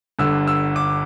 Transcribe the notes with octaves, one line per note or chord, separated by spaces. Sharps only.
G1 G2 D3 E6
E6
D6